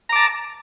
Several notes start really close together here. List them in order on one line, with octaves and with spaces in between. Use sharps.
A#5 D6 A5